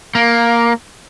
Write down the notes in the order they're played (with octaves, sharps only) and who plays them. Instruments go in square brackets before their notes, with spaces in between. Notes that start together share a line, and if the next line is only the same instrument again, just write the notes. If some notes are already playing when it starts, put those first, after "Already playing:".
[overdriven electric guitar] A#3